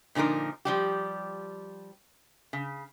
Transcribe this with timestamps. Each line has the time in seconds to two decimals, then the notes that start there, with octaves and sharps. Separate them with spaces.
0.15 A#2 D3 F3 D#4 A#4
0.65 F3 G3 G4
2.53 C#3